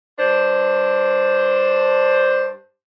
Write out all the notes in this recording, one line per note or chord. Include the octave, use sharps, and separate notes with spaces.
G2 D4 C5